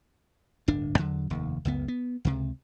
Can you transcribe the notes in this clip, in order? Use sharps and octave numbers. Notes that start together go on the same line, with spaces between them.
D1 G1 D4
E2 D3 F#3
F1 D#2
F#1 C#2 B3
B3
C#2 C3